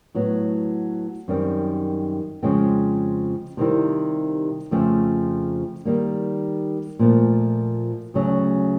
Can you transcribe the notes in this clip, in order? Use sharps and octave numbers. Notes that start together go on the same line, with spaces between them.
A2 F#3 B3
F#2 D#3 G3 C4
F2 C#3 F3 G#3 C4
C3 D#3 G3 C4 E4
F2 C#3 F3 A3 C4
D#3 G3 A#3
A#2 F3 A3
D2 C#3 F#3 A3 C#4